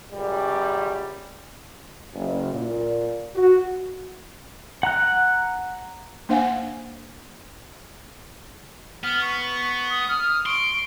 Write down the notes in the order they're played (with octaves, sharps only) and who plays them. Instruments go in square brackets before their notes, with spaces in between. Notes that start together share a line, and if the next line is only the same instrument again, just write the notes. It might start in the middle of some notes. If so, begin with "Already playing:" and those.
[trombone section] C#2 F#2 G3
[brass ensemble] F#1
A#2
F#4
[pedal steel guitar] F#5 A#5 F#6
[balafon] A#3 D4 C5 F5 F#5 G#5
[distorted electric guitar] B3 [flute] F6
[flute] C#6
[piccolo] D#6
[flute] D#6 [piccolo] F6
[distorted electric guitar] C6 [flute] C#6 [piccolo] D7